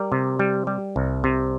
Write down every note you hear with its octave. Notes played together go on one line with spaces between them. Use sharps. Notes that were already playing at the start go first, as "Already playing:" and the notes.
Already playing: G3 A#4 D5
C3
G3
G3
C2
C3